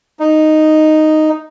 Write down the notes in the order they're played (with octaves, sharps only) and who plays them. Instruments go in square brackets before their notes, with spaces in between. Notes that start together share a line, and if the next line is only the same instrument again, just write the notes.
[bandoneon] D#4